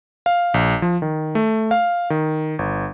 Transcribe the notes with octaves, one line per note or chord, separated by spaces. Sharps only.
F5
A#1
F3
D#3
A3
F5
D#3
G1